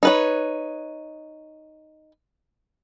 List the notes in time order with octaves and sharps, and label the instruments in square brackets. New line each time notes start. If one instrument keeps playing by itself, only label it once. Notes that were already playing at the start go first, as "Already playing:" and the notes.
[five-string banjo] D#4 B4 C#5